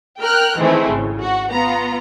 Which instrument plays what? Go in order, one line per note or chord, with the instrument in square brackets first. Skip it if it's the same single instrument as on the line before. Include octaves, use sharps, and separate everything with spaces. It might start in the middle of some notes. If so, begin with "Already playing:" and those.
[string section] A#4 G5 F6 F#6
D#3 E3 G#3 A3 C4 E4
G#1 C#3
F#4
B3 F4 A#5